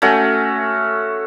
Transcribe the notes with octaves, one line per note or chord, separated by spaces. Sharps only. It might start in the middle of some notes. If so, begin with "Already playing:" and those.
A3 C#4 F#4